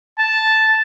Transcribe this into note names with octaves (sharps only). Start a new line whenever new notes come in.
A5